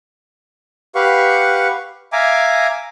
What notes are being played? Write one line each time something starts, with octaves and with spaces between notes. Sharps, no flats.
G4 B4 F5 F#5 C#6
E5 F5 G#5 A#5 D6